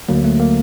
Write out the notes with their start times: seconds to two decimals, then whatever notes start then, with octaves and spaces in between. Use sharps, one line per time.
0.09 D2 D3 F#3 A#3
0.24 A3
0.40 A#3